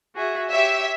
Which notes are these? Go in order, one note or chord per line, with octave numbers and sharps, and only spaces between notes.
F#4 G#4 E5
G4 C#5 E5